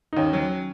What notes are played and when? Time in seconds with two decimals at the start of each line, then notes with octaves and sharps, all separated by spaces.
0.13 D#4
0.17 D#2 C#4
0.33 F#3